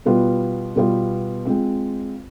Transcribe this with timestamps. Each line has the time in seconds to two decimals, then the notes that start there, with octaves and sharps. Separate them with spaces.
0.06 B2 G3 B3 F4 B4
0.76 B2 G3 B3 F4 B4
1.45 G#3 C4 F4